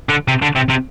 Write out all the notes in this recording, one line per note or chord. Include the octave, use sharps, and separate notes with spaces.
D3
C3
D3
C3
C3